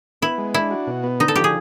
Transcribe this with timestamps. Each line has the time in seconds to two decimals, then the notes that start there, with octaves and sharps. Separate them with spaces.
0.22 B3 E4
0.38 G#3
0.54 D4 E4
0.71 F#4
0.87 B2
1.04 B3
1.20 D3 D#4
1.28 A4
1.36 F3 G4
1.44 G#4